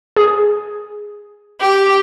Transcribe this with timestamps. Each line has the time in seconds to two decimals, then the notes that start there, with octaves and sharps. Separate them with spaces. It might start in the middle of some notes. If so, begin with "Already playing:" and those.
0.17 G#4
1.61 G4